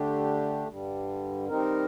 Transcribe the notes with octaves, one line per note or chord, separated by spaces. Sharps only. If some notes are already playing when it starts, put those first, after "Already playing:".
Already playing: D3 A3 D4 G4
G2 D3 G3
D#3 G3 C4 D#4 A#4